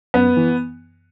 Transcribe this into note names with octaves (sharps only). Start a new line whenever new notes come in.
F#2 B3
E3